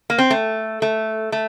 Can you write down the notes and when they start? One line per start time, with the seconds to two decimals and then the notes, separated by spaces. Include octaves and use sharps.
0.10 A#3
0.18 C4
0.30 A3
0.82 A3
1.32 A3